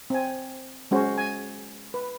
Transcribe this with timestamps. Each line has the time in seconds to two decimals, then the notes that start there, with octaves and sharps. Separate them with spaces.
0.10 C4 G#5
0.91 G#3 C#4 F#4 C5
1.18 G#5
1.94 B4